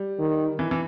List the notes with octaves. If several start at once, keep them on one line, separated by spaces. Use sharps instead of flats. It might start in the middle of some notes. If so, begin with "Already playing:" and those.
Already playing: G3
D#3
E3
E3